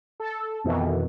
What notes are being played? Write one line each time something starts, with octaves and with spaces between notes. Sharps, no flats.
A4
F2 B2 D#3 E3